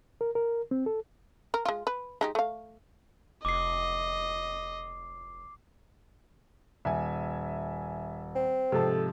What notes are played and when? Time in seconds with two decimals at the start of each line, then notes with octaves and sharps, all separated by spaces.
0.21 A#4
0.35 A#4
0.71 C4
0.86 A4
1.54 A#4
1.65 G#3 F4
1.87 B4
2.21 G#3 D#4 G4
2.35 A3 F5
3.45 F1 D#5 D6 C7
6.85 D#1 E5 G#5
8.35 C4
8.72 G#2 C3 F3 A4 A5